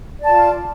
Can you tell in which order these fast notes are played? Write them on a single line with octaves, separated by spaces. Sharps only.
D5 A5 F4